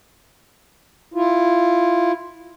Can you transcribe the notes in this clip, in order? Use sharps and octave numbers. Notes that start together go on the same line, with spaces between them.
E4 F4